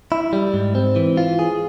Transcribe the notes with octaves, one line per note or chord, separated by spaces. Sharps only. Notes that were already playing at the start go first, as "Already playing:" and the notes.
E4
G3
G#2
C4
E3
F4
G#4